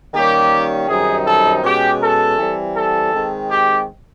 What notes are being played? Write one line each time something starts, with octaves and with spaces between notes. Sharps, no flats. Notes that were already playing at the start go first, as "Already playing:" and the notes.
D#3 G3 A#3 C#4 G4
F#2 D#3 G3 C4 D#4 G#4
A4
B2 G#3 C#4 G4
A4
E3 G3 C4
A4
D#3 G#3 C4
G4